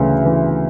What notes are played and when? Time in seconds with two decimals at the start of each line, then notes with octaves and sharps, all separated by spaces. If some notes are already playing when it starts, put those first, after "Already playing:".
Already playing: D2 C#3 E3
0.25 E3